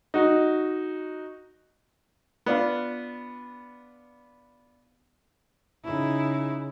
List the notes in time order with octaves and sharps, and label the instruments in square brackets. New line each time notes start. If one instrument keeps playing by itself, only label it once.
[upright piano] D#4 F#4
[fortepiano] B3 D4 F4
[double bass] C#3 [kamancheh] D#4 E4